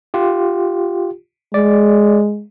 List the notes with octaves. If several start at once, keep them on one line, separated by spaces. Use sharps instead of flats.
F4 G4
G#3 D5